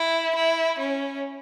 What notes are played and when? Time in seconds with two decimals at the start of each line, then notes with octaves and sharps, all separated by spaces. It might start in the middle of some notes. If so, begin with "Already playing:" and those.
Already playing: E4
0.35 E4
0.79 C#4